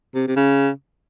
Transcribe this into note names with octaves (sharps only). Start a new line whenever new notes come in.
C3
C3
C#3